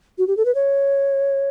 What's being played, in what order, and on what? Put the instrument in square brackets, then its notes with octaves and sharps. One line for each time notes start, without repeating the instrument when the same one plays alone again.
[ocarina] F#4
G4
A4
B4
C#5